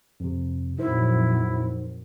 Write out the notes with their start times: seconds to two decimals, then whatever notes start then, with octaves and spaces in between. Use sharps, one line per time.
0.20 F2 C3
0.79 F2 A#2 F#3 D#4 E4 A#4 C5